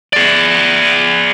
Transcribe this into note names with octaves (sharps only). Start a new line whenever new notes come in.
G#4 D5